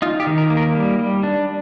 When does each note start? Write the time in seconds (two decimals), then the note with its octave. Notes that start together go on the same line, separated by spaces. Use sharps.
0.02 D#4 F4
0.20 G4
0.27 D#3
0.38 A#4
0.50 A#3
0.57 A#4
0.75 G3
0.99 G3
1.23 D4